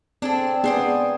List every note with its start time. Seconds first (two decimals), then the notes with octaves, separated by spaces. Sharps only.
0.22 C4 D4 G#4 A4
0.64 B3 D4 G#4 C5 D5